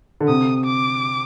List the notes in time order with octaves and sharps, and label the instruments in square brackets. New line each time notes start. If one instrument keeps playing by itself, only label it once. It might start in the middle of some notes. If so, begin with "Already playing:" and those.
[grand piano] D3
[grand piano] C3 [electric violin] D#6
[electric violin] D6